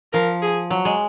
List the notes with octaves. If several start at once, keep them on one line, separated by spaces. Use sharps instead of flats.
F3 A#4
G#4
F#3
G#3